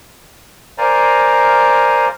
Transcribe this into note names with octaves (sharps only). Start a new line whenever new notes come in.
A#4 C5 D5 F5 G#5 A#5